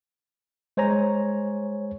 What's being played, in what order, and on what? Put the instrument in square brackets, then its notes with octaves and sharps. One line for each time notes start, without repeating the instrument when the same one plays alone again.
[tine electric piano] G#3 C5 C#5 G#5 A#5